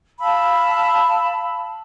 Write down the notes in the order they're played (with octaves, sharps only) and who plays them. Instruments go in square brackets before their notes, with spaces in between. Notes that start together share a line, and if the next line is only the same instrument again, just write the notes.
[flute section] F5 A5 B5 E6